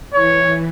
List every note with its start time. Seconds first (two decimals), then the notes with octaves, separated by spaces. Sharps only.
0.14 E3 C#5